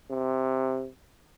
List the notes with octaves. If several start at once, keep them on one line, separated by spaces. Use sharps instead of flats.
C3